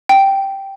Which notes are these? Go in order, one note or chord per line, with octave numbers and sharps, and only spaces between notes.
G5